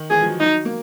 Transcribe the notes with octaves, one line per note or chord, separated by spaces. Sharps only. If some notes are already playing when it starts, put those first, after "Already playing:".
Already playing: D#3
E3 G#4
F3
F#3
F#3 D#4
A#3